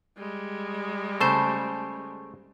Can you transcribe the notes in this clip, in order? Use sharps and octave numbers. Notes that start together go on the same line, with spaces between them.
G3 G#3
C#3 A3 C5 A5